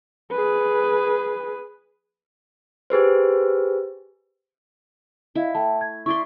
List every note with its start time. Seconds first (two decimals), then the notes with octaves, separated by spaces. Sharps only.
0.32 G#4 B4
2.90 G4 G#4 B4 C5
5.35 E4 D#5 F5
5.55 A3 E5 G5 A5
5.81 G#6
6.06 E4 D5 C6 C#6